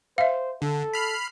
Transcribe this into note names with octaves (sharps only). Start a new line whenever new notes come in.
C5 E5 F5
D3 A4
B5 F6 C7